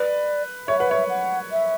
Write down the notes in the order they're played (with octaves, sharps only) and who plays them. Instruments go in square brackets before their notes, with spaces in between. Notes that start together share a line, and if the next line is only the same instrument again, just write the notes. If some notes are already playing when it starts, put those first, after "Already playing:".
Already playing: [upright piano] B4 [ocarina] D5
[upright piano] C#5 [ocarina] E5
[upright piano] B4 [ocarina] F#5
[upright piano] C#5 [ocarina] E5
[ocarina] F#5
E5